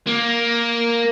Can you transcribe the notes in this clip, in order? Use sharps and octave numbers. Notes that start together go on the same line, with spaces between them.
A#3